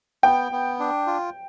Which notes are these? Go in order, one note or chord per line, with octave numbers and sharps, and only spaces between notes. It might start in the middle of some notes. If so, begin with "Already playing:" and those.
B3 G5
B3
D4
F4